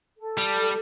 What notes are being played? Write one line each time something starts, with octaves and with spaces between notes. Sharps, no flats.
A4
G3